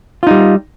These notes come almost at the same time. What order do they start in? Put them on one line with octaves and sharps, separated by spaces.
F4 D#4 G3